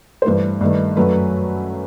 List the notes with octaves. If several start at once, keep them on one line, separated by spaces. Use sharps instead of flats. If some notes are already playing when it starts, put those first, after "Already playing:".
C5
G2 E3 A3 B4
G2 D#3 A3
F#2 F#3 A3 B4